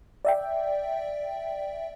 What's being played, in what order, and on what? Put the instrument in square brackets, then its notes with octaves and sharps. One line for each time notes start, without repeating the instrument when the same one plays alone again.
[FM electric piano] D5 E5 G5